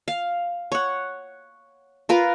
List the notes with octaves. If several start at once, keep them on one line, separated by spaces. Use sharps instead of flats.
F5
C#5 F#5
F4 A#4 B4